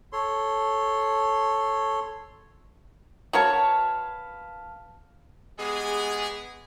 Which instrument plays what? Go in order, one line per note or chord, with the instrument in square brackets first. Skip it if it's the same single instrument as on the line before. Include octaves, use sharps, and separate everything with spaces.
[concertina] A4 C#5 C6
[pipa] F#4 A#4 C#5 [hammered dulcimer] B4 F5 A5
[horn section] G#3 B3 G4 G#4